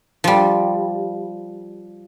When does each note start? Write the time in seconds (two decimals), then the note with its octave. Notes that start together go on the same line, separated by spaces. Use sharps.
0.24 F3 G3